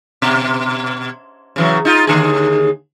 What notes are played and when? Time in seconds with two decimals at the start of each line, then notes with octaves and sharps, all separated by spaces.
0.22 B2
1.56 C#3 E3 F#3
1.85 D#4 F4
2.07 D#2 D3 G#4